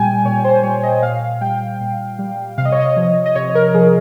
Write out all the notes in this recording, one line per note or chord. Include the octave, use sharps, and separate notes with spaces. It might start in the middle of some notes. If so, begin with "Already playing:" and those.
Already playing: A#2 G3 G5 G#5
A#2 C#5
C5
G3 C#5
D#5
A#2 F5
G3 G5
A#2
G3
C3 F5
D#5
C#5
D#5
F3
D#5
C3 C#5
A#4
F3 G#4